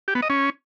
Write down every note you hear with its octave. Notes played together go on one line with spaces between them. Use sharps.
G4
B3
D#5
C#4